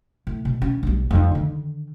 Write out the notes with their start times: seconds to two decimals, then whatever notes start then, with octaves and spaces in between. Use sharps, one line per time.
0.27 A2
0.45 B2
0.62 C#4
0.83 B1 G3
1.11 F2 D#4
1.32 D3 D#3